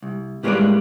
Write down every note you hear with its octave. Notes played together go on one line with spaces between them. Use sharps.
C2
A2 G3 G#3 A#3 B4 D5